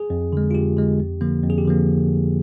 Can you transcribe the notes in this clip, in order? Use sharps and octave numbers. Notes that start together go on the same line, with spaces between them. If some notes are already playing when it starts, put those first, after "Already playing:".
Already playing: G#4
F2
D3 G#3
F4
F2 G4
D3 G#3
F2
D3 F3 A#3
F2
G#4
G4
D3 F3 A#3